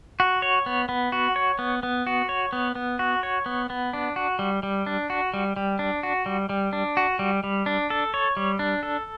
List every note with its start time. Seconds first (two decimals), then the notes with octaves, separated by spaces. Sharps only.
0.20 F#4
0.42 C#5
0.66 B3
0.89 B3
1.12 F#4
1.36 C#5
1.59 B3
1.83 B3
2.07 F#4
2.29 C#5
2.53 B3
2.75 B3
2.99 F#4
3.23 C#5
3.46 B3
3.70 B3
3.93 D4
4.16 F#4
4.39 G3
4.63 G3
4.86 D4
5.10 F#4
5.34 G3
5.56 G3
5.79 D4
6.03 F#4
6.26 G3
6.49 G3
6.73 D4
6.97 F#4
7.19 G3
7.44 G3
7.66 D4
7.90 A4
8.14 C#5
8.37 G3
8.59 D4
8.83 A4